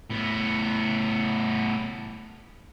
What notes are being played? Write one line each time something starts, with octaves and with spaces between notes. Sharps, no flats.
A2 B3